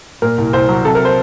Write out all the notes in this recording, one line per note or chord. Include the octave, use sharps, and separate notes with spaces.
A#2 A#4
C2
C2 C5
F#3
C3 A4
A#4
C5